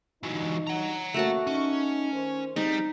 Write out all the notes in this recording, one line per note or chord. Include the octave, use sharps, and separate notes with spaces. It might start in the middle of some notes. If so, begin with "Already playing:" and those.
G2 E3 F#3 D#4
F#5 A#5
F#2 B2 A3 A#3 F#4 A5
C#4 D#4
D#3 C5
G3 G#3 C4 D#4